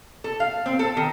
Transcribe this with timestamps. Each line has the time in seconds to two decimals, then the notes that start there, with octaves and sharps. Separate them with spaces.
0.24 A4
0.40 F5
0.66 C4
0.79 A4
0.97 D#3